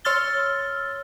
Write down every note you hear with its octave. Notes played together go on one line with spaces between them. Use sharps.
C#5 C6 E6 F6 A6 G7